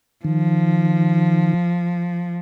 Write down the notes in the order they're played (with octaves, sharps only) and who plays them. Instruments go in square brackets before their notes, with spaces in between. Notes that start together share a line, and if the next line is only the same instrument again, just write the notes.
[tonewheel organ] D#3 [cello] F3